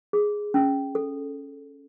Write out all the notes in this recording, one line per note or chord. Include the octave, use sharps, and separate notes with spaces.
G#4
C#4
A4